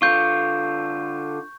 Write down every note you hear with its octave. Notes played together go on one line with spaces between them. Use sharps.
D3 F4 C#6 G6